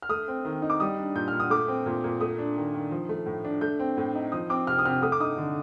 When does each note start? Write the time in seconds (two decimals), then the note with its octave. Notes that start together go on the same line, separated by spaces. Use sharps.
0.02 F6
0.09 A3 D#6
0.28 C4
0.45 D#3
0.62 D#4
0.70 D6
0.80 G3 D#6
0.98 D4
1.15 A#2 G6
1.28 A#2 F6
1.40 D#6
1.50 A3 D6
1.68 C4
1.86 A#2
2.04 A#2
2.21 A3 D#6
2.38 D4
2.57 D#3
2.74 D#3
2.91 F3
3.09 A3
3.26 A2
3.44 D4
3.61 A3 G6
3.79 C4
3.97 A2
4.15 D#4
4.32 F3 D#6
4.50 C4 D6
4.67 C3 F6
4.79 D#6
4.85 C3 F6
5.02 A3 D#6
5.12 D6
5.20 D#4 D#6
5.38 D3